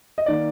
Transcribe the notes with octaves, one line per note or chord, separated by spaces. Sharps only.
D#5
D#3 A#3 D5